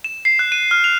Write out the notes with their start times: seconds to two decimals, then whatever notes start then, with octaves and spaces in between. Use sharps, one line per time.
0.04 E7
0.25 C7
0.39 F#6
0.52 D#7
0.71 F6
0.84 F7